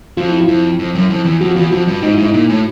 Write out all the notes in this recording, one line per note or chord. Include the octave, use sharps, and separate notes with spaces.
F2 F4
E4
F4
F2
F2
F#2
F2
E2
F2 F#4
F4
E2 F#4
F2 F4
G2
G#2 D#4
G#2 E4
D#4
A#2
A2